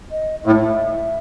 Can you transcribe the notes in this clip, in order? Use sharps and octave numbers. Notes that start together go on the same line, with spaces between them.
D#5
A2 E5